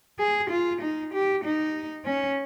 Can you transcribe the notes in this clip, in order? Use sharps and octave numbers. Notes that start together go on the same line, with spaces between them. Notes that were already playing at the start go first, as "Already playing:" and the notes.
G#4
F4
D#4
G4
D#4
C#4